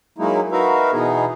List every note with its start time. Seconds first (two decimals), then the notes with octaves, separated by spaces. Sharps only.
0.18 F#3 G#3 A#3 D#4 E4
0.52 D#4 F#4 A#4 B4 E5 F5
0.92 B2 E3 B3 D#4 G#4